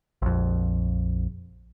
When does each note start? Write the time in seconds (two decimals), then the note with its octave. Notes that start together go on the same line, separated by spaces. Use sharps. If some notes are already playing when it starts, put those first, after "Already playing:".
0.22 A#1 F2